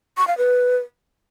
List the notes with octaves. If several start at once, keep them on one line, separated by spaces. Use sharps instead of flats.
C#6
F5
B4